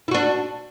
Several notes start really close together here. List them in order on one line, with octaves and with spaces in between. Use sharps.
E4 F#4 D4